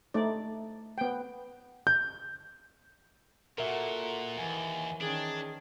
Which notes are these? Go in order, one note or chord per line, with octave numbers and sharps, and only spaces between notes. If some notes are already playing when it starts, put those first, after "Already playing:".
A3 D#4 D5
B3 G5
G6
A#2 F#4 A4 A#4 E5 F#5
D#2 E3 G#5
D#3 C#4 D4 G#4